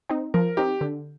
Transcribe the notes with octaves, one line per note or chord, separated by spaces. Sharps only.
C4 D#4
F3 A#4
C4 D#4 G4
D3